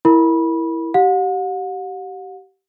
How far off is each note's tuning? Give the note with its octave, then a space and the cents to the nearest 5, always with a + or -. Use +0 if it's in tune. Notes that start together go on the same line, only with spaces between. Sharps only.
E4 +0 A#4 +0 B5 -20
G4 -25 F#5 -40